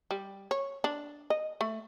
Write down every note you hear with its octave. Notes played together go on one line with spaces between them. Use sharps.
G3
C#5
D4
D#5
A3